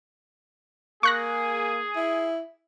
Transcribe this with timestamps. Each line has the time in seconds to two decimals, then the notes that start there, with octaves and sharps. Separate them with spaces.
1.03 A#3 G#4 C#6 F#6 A#6
1.96 E4